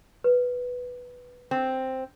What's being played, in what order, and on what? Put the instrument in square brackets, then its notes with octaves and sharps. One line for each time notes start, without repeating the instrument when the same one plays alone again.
[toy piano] B4
[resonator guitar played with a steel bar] C4